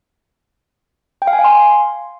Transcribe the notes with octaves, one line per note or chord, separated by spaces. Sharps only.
G5
F5
G#5
F5
C6